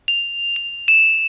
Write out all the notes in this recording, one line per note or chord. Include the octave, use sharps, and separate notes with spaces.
F7
F7
E7